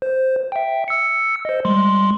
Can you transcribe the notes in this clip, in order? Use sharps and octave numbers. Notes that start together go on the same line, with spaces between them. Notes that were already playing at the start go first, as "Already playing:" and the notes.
C5
E5 G5
E6 C#7
C5 D#5
G3 G#3 C6